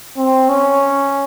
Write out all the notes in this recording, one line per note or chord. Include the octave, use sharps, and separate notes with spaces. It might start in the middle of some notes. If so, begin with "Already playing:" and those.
C4
C#4